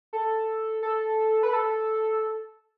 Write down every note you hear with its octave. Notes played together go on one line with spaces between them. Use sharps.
A4
A4
B4
A4